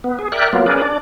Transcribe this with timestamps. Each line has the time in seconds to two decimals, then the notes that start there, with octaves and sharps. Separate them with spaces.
0.04 B3
0.19 G#4
0.32 A#4 D5 E5 G5 F#6
0.53 F#3 A#3 B3 F4
0.66 C#4 G#4 A#4 B4 D5
0.82 D4 D5